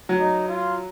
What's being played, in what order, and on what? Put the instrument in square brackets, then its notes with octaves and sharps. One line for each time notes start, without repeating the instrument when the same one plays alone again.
[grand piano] F#3
[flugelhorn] D#4
F4